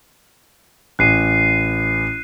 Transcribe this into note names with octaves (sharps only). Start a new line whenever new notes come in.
A1 F#6 C7 D#7